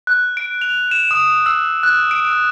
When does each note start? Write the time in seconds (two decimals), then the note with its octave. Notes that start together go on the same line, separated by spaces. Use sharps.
0.07 F#6
0.37 D7
0.62 F7
0.91 E7
1.11 D#6
1.46 E6
1.83 F#6
2.11 D7
2.30 E6